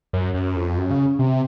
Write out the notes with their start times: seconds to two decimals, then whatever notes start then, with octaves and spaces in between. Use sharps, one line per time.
0.13 F#2
0.34 F#2
0.56 F2
0.78 F#2
0.91 C#3
1.19 C3